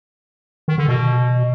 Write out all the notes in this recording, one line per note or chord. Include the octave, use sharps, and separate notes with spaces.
D#3
D3
B2